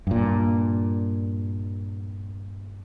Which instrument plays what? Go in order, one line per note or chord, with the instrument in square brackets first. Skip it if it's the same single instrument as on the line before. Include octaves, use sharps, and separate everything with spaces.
[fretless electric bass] G2 A#2